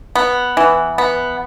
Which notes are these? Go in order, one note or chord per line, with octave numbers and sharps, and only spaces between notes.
B3
E3
B3